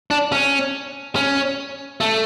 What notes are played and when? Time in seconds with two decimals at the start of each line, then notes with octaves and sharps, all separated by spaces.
0.11 D4
0.32 C#4
1.16 C#4
2.01 A3